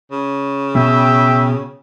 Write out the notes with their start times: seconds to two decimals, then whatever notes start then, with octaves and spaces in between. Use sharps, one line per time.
0.12 C#3
0.76 B2 E5 G5